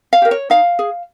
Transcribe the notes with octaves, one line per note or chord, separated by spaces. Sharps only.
F5
G4 A#4
C#5
D#4 F5
G#4